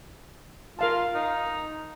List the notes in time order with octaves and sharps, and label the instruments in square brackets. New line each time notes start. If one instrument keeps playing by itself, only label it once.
[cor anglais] F4 [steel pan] A#4 F5 A5
[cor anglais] D#4